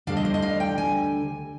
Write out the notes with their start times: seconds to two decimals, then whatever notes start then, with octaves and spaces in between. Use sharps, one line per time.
0.07 D2 D3 G3 D4 F5
0.17 D#5
0.25 C5
0.34 D#5
0.42 F5
0.60 G5
0.78 G#5